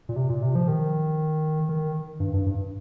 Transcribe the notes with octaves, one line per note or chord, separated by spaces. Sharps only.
A#2
C3
A#2
C3
F3
D#3
D#3
G2
G2
G2